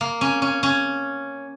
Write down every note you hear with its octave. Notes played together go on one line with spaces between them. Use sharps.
A#3
C#4
C#4
C#4